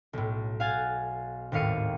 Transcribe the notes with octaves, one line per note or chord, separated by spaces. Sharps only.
B1 A2
F5 F#5 G#5 F6 A6
G#1 D#2 A2 F5 C#7 D#7